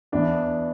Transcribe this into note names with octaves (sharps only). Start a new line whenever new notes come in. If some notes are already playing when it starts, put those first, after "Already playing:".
E2 E3 B3 D4